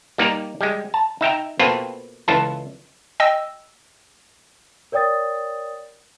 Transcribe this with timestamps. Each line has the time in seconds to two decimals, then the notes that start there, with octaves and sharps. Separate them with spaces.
0.18 G3 A#3 D#4 D5 A#5
0.61 G3 G#3
0.94 A5
1.21 D#4 E5 G5 A#5
1.59 B2 A#3 C4 F4 A4 B4
2.28 C#2 E3 F4 A4 A5
3.20 D#5 G5 E6
4.92 A#4 C#5 D5 G5 D#6 A6